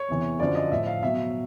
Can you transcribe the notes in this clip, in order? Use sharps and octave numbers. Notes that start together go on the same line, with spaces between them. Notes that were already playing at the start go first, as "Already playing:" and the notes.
Already playing: C#5
E2 C3 E3
F#2 D3 F3 D5
D#5
A2 F3 E5
F5
B2 F#3 E5